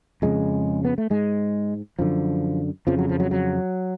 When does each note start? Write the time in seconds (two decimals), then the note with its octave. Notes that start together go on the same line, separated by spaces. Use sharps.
0.22 F2 C#3 G#3
0.85 B3
0.98 A3
1.10 G#2 G#3
1.99 F#2 D3 F3
2.87 F2 C#3 F3
2.99 F#3
3.09 F3
3.20 F#3
3.31 F#3